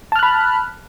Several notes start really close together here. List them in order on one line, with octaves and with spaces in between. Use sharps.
A5 F6 F#6 B5